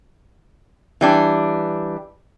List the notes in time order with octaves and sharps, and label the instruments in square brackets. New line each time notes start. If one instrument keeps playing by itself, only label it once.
[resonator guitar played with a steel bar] E3 G3 D4